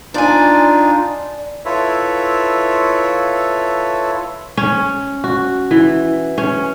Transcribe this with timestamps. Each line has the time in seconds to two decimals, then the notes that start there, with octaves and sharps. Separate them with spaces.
0.14 D4 D#4 F4 D5 G#5
1.65 E4 F4 A4 B4 C#5 E5
4.57 C#4
5.24 F#4
5.71 E3
6.38 C#4